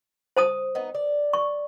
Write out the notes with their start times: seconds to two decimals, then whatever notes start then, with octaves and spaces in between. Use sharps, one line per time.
0.37 C5 A5 D#6
0.75 B3 D#4
0.95 D5
1.33 C#6